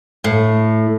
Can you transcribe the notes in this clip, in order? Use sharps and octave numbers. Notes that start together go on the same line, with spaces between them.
A2